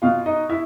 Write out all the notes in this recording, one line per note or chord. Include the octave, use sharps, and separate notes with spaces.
B2 F4 F5
D#4 D#5
E4 E5